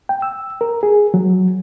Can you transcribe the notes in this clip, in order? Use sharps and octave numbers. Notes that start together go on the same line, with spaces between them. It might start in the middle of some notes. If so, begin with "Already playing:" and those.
G5
E6
A#4
G#4
F#3